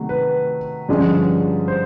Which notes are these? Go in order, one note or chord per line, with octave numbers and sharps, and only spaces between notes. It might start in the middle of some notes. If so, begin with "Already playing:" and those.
Already playing: C3 D#3 F#3 A3
B4
G2 D3 F3 G#3 C#4
C5